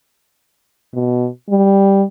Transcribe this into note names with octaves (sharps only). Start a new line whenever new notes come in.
B2
G3